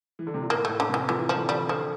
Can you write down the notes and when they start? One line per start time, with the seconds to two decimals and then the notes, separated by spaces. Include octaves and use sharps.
0.19 E3
0.27 D3
0.34 C3
0.42 A#2
0.50 A2 A#3
0.65 A3
0.69 A2
0.80 D3
0.89 C3 E3
1.09 E3 F3
1.19 E3
1.28 D3 F3
1.37 E3
1.49 G3
1.69 D3 F3